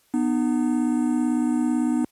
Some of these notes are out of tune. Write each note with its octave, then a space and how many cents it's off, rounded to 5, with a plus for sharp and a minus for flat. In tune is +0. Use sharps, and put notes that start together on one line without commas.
B3 +0 D#4 -35